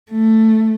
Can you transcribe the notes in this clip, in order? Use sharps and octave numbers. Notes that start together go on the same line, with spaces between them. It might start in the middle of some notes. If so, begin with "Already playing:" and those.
A3